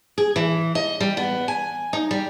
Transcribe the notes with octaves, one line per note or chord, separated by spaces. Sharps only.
G#4
E3
D#5
G3
B3
G#5
D#4
G3